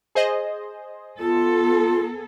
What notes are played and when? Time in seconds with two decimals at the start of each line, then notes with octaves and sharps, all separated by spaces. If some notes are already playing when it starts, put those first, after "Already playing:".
0.15 G#4 C5 D#5
1.19 B3 F4 A4